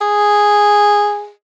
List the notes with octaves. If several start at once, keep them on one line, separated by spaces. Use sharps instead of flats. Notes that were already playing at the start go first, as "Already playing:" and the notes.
G#4